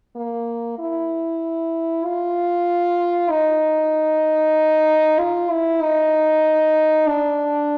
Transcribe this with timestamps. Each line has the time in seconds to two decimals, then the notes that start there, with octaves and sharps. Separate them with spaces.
0.16 A#3
0.79 E4
2.04 F4
3.30 D#4
5.19 F4
5.50 E4
5.82 D#4
7.07 D4